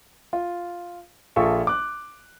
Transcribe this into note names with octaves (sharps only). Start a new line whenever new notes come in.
F4
A#1 F4 A4 E5 C#6
D6 F#6